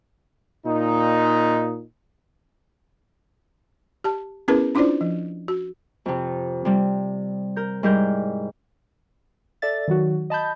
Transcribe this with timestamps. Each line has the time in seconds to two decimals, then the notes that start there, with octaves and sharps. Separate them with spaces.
0.66 A#2 D#4
4.04 G4 A5
4.48 B3 C#4 E4 G#4 A#4 B4
4.75 C#4 D4 E4 F4 C5 D5
5.01 F3
5.48 F#4
6.06 F2 C3
6.65 C3 G3
7.56 A#4 G6
7.83 G#2 G3 E4 A#4 D6 G6
9.62 A4 D5 E5 A6
9.88 D#3 F#3 F#4
10.30 D#5 A5 B5 G6